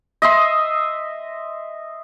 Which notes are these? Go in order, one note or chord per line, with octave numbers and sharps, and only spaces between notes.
D#5 E5 C6